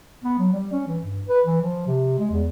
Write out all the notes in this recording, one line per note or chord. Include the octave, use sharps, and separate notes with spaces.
B3
F#3
G3
C#4
E3
G2
B4
E3
F3
C3
G#3
E2